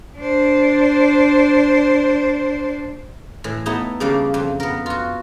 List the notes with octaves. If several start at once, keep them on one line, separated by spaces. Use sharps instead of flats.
D4 C5
A2 E3
A3 B3 D#4 E4
C#3 G3 A#3 D4
F2
B3 A#4
F4 F#4